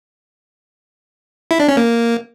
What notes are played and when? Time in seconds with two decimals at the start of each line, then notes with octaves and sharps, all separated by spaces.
1.51 E4
1.60 D4
1.68 C#4
1.77 A#3